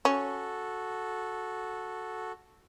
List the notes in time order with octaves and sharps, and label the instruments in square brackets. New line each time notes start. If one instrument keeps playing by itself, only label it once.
[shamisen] C#4 [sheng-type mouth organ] F#4 A4